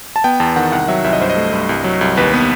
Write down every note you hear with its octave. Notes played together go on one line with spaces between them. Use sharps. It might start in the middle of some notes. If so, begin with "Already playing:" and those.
A5
B3 G5
E2 A5
D#3 F#5
C2 F#5
F#3 E5
C2 E5
D#5
G2 C5
D#5
A3
G2
C2
F#3
C2
D#2 B4
B3